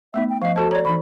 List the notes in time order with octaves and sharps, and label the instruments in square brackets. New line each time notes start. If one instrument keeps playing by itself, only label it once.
[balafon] A3 B3 D#4 [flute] E5
[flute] G5
[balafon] F3 D#5 [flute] F5
[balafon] F#4 A4 C5 [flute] A5
[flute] C#5 [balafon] D5 A#5
[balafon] E3 D#4 [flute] B5